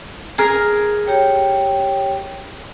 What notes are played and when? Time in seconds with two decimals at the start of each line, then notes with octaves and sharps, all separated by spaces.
0.38 G#4 A#4
1.06 G4 C#5 G5